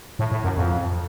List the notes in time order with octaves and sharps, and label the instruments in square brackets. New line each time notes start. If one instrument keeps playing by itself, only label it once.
[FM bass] A2
A2
F#2
F2